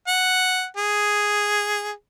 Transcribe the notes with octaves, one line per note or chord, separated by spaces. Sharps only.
F#5
G#4